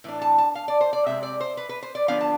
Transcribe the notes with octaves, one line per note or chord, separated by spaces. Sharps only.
A2 E3 D4
A5
A5
F5
D5
C5
D5
C3 G#3 C4 E5
D5
C5
B4
B4
C5
D5
D3 F3 B3 D4 F5
A5